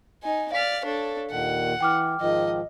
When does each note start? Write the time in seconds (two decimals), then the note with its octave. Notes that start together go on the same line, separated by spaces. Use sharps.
0.23 D#4 G#5
0.52 D5 F5 F6 B6
0.85 D4 A4 C#5
1.31 D#2 A#2 D#3 F#5
1.81 E3 G5 D6 F6
2.21 G#2 D#3 F3 D#5